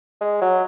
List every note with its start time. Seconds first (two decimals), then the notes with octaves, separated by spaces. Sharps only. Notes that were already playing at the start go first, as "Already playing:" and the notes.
0.21 G#3
0.41 F#3